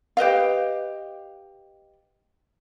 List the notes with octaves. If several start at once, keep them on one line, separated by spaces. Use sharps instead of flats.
G4 B4 D#5 F5